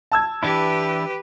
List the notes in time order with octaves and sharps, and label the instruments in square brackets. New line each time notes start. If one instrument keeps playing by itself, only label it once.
[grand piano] A5 E6 G#6
[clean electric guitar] E3 D4 E4 [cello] G4 B4